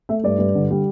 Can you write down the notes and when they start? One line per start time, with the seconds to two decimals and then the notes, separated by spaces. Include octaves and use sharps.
0.09 A3 E5
0.24 G2 D5
0.39 G2
0.55 D3
0.70 G3